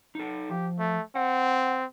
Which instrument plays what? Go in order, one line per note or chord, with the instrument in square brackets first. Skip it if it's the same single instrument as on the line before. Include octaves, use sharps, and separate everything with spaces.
[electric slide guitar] D#4 A4
[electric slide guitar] F3 [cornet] G4
[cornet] A3
[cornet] C4 [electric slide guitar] F#5